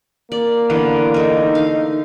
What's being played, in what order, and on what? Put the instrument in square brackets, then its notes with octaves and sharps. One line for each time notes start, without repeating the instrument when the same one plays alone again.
[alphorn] A#3 [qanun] D5
[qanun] D3 E3 B3 [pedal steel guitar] D5 F5
[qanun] A3 A#4 [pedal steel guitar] D#4
[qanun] F5